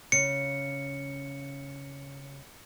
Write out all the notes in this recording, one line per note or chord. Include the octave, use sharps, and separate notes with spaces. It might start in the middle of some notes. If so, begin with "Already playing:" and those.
C#3 C#7